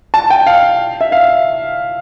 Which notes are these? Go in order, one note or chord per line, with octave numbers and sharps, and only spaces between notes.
A5
G5
F5
E5
F5